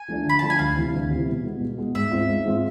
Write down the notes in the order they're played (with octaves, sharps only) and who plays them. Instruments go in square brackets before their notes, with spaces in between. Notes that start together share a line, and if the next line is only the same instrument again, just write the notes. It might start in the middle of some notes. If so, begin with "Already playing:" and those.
Already playing: [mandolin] G#5
[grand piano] F3 A3 D4 F4
[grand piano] D3 [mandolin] B5
[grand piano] F3 A3 D4 F4 [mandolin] A5
[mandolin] G#5
[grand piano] D2 [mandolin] F5
[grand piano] C3 E3
D2
C3 E3
B2
G#3 B3
B2
G#3 B3
[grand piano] G#2 [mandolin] E5
[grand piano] G#3 C4 F4
G#2
G#3 C4 F4